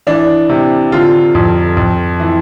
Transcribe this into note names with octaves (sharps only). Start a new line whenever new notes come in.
E3 D4
C3
D3 F4
F2
F2
E3